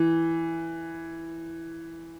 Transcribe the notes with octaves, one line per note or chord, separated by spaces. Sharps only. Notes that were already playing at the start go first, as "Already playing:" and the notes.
Already playing: E3